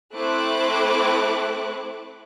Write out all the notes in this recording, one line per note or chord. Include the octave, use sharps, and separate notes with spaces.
A3 C4 E4 D6 F#6